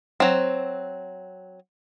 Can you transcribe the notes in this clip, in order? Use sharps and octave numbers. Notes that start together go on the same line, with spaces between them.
F#3 C4